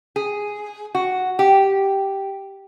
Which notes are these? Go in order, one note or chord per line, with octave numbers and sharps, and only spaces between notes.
G#4
F#4
G4